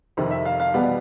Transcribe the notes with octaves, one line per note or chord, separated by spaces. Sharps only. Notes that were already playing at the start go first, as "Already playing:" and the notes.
F2 C3 D#3
E5
F5
F5
E2 B2 G3 B3 F#5